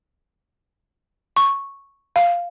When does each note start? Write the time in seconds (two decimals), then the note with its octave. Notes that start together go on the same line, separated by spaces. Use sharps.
1.37 C#6
2.16 F5